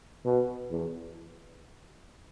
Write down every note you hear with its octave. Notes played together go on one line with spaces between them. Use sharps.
B2
E2